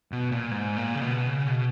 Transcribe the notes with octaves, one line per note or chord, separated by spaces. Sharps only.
B2
A#2
G#2
A#2
C#3
B2
C#3
B2